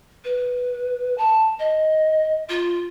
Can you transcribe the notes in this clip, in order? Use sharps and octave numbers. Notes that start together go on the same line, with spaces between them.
B4
A5
D#5
F4